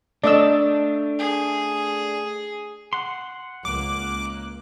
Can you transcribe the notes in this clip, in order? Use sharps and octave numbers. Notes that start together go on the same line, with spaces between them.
A3 D4 D5 D#5 E6
G#4
F#5 C6
C#2 A#3 D6 F#6